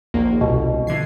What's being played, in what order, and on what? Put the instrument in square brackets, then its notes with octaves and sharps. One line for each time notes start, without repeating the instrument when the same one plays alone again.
[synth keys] A#1 A#3 [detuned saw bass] D#2
[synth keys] G1 [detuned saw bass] C2 [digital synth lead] B2
[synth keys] D3 G#6 C7 [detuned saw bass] E3